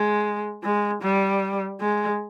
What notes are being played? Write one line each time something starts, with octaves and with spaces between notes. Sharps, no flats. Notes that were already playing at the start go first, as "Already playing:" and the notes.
Already playing: G#3
G#3
G3
G#3